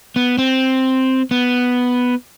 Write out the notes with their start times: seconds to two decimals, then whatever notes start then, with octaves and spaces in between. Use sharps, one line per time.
0.16 B3
0.38 C4
1.31 B3